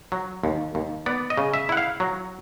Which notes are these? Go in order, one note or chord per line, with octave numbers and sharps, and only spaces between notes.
F#3
D#2
D#2
B3 D5
D#5
C#3
E5
E4 F#5
F5
F#3